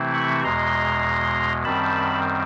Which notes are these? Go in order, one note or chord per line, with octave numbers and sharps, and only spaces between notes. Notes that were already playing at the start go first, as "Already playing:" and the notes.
Already playing: C3 E3 A3 C4 E4
B5 C#6
E2 B2 G#3 A#5 C6
F#2 D#3 G3 C4 A5 B5